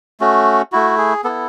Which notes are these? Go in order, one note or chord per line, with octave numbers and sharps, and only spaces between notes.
A3 C#4 F#4
A3 E4 F#4
G#4
B3 E4 A4